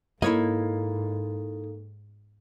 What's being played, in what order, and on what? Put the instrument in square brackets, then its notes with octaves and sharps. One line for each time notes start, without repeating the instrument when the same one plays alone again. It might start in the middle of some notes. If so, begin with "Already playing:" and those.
[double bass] G#2 [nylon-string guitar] A#3 [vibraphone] D#4 A4 [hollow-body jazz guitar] E4 C#5 D#5